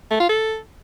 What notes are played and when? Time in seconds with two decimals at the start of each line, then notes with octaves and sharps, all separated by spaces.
0.10 A3
0.20 F4
0.29 A4